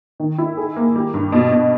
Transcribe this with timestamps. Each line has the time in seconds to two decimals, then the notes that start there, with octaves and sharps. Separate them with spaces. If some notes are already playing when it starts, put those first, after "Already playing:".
0.20 D#3
0.38 E4
0.57 G#4
0.76 A#3
0.96 G3
1.14 G2
1.32 B2
1.51 B2